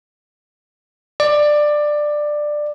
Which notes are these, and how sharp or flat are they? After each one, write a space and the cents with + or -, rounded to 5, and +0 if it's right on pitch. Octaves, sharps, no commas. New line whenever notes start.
D5 +15